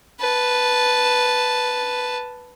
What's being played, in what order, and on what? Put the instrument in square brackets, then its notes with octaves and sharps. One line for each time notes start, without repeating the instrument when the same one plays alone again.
[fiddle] B4 A5